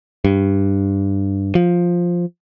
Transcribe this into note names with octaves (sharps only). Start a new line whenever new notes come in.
G2
F3